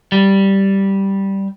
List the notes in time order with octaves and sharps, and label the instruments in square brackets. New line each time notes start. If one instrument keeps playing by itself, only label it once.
[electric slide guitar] G3